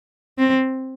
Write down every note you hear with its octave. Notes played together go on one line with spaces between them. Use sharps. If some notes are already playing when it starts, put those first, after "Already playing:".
C4